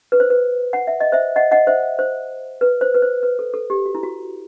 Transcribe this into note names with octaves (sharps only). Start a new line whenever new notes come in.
B4
C5
B4
F#5
E5
D#5
C5 E5
D#5 F#5
D#5 F#5
C5 E5
C5
B4
C5
B4
C5
B4
A4
A4
G4
F#4
E4
F#4